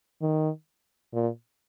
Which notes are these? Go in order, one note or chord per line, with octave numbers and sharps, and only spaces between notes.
D#3
A#2